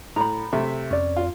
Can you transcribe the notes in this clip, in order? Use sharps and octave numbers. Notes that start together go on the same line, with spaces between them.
A2 A#5 B5
C3 A3 E5
F2 C#4 D5
F4